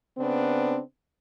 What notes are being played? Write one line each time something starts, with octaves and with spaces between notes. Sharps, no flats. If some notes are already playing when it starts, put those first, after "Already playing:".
C#3 B3 C4 D4